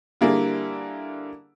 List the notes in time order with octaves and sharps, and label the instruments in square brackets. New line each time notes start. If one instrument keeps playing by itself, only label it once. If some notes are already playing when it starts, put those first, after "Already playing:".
[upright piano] D3 G3 A#3 E4 G#4